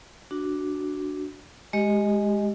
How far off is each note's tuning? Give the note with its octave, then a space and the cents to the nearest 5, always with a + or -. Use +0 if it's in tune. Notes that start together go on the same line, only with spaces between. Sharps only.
D4 +0 F#4 +0
G#3 +0 G4 +0 D#5 +0